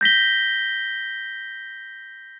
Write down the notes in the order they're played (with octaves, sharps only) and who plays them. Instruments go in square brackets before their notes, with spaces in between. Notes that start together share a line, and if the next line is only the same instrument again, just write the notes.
[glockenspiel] G6 A#6 B6 G7